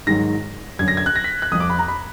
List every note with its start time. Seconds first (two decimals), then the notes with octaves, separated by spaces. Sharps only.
0.07 G#2 D#3 F#3 A#6
0.79 F#2 D3 F#3 G#6
0.88 A#6
0.97 G#6
1.06 F#6
1.16 A#6
1.24 B6
1.42 F#6
1.52 F2 D#6
1.55 F3
1.60 D6
1.70 B5
1.79 A#5
1.88 B5